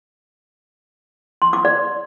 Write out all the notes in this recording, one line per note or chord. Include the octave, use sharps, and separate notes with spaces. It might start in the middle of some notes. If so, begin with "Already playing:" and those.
C6
D6
D5